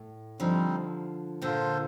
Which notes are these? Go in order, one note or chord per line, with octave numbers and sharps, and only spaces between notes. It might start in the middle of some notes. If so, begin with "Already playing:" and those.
Already playing: A2
D3 F3 G3 C4 D#4
A#2 D3 F4 A4 C5